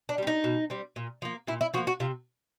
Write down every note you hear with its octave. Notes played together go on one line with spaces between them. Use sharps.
D4
G3 C4
D#4
B2
G3 C4
A#2
F3 A#3
A#2 E4
E4
F3 A#3 F#4
F#4
C3 F4